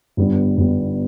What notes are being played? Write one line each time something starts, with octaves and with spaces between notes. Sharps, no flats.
G1 G2 G3 B3
G1 G2 G3 B3